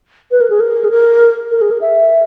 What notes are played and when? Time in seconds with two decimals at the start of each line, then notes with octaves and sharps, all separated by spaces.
0.31 B4
0.41 A#4
0.50 G#4
0.60 A#4
0.84 G#4
0.91 A#4
1.51 A#4
1.61 G#4
1.71 A#4
1.81 E5